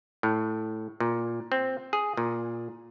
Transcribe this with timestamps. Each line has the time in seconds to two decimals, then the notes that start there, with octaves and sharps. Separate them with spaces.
0.23 A2
1.00 A#2
1.52 C4
1.93 G#4
2.17 A#2